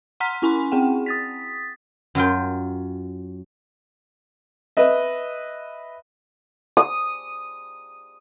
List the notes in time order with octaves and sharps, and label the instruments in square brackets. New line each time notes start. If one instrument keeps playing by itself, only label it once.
[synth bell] F#5 A#5 C6 F6 B6
C#4 E4 G#5 B5 C6
C4 G#4 F#5 G5
D#6 A6 B6
[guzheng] F#2 F#3 F4 G5
[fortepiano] B4 D#5 E5
[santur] D#6